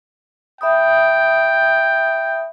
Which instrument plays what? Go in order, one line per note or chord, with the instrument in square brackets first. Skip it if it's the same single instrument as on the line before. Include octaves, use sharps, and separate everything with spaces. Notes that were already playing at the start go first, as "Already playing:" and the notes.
[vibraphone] E5 B5 D#6 [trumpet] G5